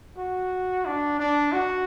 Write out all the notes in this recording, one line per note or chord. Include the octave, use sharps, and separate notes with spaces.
F#4
D4
D4
F#4